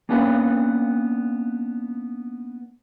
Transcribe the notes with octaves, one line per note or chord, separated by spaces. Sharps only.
A#3 B3 C#4 D4 B4